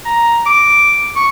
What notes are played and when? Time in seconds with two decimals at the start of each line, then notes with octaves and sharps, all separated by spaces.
0.05 A#5
0.46 D6
1.16 C#6